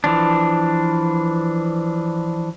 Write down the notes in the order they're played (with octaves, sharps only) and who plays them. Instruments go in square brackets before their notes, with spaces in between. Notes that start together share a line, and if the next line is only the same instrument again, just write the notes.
[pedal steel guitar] E3 F3 D4